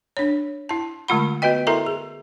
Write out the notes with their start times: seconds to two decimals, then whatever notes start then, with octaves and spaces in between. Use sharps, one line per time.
0.17 D4 C#5
0.69 E4 A5
1.08 D3 G#3 A3 F4 F#5 B5
1.42 B3 F#4 B4 D#5 G5
1.67 E4 A4 A#4 E5 A#5 C6
1.86 G#4